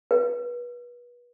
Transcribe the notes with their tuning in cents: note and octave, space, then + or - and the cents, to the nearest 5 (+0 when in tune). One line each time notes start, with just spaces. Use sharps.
B4 -30